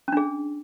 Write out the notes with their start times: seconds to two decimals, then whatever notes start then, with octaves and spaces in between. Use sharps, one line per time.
0.08 C#4
0.12 D4
0.17 G#4